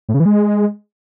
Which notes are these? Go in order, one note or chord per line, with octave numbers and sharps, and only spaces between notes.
A2
C#3
E3
G#3